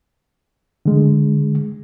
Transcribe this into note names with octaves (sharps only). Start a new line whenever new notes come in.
D3 G#3